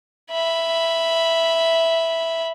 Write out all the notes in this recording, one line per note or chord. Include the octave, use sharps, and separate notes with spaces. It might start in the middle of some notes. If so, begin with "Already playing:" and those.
E5 B5